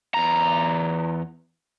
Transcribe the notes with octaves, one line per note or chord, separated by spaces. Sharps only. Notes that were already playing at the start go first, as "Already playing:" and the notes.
E2 A#5